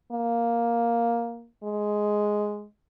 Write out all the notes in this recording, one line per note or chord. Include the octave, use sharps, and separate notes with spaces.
A#3
G#3